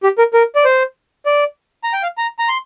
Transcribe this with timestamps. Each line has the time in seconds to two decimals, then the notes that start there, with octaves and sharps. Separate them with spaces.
0.03 G4
0.18 A#4
0.34 A#4
0.55 D5
0.65 C5
1.26 D5
1.84 A#5
1.93 G5
2.03 F5
2.18 A#5
2.39 A#5
2.48 C6